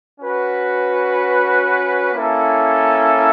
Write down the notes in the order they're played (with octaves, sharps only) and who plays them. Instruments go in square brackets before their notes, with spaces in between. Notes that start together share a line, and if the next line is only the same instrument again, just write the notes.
[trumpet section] C#4 F#4 B4
A#3 C#4 E4 A4